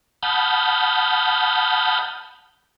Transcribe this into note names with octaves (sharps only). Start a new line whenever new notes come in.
F#5 A5 B5 D#6 F6 G6